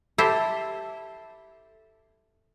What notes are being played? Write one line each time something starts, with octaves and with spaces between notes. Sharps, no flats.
E4 G4 A4 C5